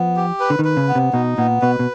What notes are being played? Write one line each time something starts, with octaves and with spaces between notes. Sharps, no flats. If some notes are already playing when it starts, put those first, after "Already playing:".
Already playing: F3 B3
G4
B4
D3
D#3
B4
C#3
B3
C3
B2 D#4
A#2 B3
B2 B4
B2